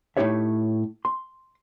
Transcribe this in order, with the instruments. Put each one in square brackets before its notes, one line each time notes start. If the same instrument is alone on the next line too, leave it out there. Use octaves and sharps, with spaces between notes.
[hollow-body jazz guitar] A2 C#4 D#4 G4 C#5 E5
C6